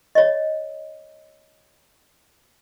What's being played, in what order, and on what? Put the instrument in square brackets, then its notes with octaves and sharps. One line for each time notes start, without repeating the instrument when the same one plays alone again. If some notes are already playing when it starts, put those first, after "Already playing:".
[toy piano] C#5 D#5